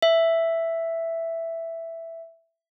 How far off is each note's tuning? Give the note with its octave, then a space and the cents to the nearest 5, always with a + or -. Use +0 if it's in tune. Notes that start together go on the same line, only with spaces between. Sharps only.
E5 +5